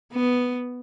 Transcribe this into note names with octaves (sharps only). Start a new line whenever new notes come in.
B3